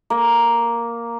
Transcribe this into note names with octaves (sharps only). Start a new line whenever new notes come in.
A#3